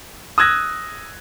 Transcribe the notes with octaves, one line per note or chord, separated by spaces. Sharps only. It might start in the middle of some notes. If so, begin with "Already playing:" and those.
D#6 E6 F#6 G#6 A#6